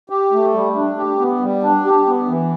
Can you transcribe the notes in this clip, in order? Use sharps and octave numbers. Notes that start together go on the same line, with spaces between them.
G4
A3
G3
D4
G4
B3
G3
D4
G4
B3
E3